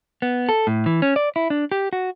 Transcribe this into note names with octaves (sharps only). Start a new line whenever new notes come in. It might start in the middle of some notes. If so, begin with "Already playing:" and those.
B3
A4
A2
E3
C#4
D5
E4
D4
G4
F#4